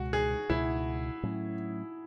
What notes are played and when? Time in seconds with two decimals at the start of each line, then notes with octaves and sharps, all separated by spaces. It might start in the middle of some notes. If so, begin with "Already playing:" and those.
Already playing: C#2 B2 G#3 F#4
0.13 G#4
0.50 C#2 B2 G#3 E4
1.23 A2 F#3 A3 C#4